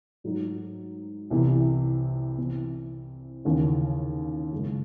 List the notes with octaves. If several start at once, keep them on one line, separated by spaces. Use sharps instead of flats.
G#2 F#3 A3 D#4 F#4
C2 C3 E3
C3 E3 C4
D#2 C#3 E3
F#2 C#3 G#3